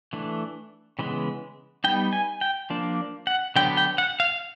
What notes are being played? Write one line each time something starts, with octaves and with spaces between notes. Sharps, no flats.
E3 A3 D4
C#3 E3 G#3 B3
G3 B3 D#4 G5
G#5
G5
F3 A#3 D4
F#5
D3 F#3 B3 D4 G5
G5
F#5
F5